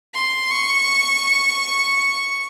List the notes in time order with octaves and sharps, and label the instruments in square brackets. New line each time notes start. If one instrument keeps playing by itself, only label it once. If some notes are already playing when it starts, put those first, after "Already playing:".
[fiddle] C6
C#6